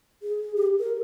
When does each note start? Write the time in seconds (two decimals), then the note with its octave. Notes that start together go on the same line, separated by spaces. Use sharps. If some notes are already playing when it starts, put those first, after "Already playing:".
0.23 G#4
0.56 G4
0.79 A#4